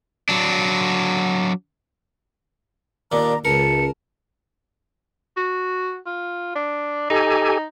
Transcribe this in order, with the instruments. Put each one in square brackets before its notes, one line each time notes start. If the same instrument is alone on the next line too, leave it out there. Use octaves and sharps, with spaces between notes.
[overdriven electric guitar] F#3 D4
[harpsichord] D#2 A#2 D4 [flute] A#5
[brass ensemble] C#2 [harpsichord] A#4 [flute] A5 [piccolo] C#7
[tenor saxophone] F#4
F4
D4
[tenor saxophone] D#4 [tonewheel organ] G4 A4 G#5